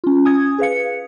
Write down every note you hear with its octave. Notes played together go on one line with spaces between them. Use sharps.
C#4 F4
G#5 D#6 G#6
G#4 B4 F5 C#7